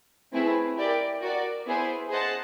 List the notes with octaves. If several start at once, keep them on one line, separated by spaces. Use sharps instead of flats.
A3 C4 E4 G#4 B4
E4 G4 A#4 D5 G5
F#4 A#4 D5
B3 E4 G#4 C5
G#4 C5 D#5 F#5 A5